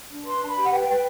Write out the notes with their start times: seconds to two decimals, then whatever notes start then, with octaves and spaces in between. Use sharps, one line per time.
0.10 D4
0.25 B4 C6
0.41 D4 A5
0.49 B5
0.56 G4
0.64 F#5
0.71 B4 G5
0.88 B4 G5